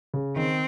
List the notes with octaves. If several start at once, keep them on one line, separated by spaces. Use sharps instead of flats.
C#3
D#3 C4